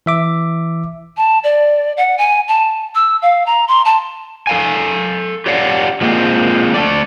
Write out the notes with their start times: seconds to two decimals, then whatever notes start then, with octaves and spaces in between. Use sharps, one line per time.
0.06 E3 E5 D6
1.17 A5
1.44 D5
1.97 F#5
2.18 G#5
2.48 A5
2.95 E6
3.22 F5
3.47 A#5
3.68 C6
3.85 A5
4.47 A4 F5 G#5
5.46 G4 C#5 D5 F5 F#5
6.01 F3 G#3 A#3 C4
6.74 A3 A4 D5